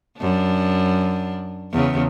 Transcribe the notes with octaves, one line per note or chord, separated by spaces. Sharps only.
F#2 D4
E2 C#3